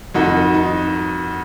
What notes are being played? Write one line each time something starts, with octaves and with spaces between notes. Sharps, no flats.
F2 D#3 D#4 F#4
D#4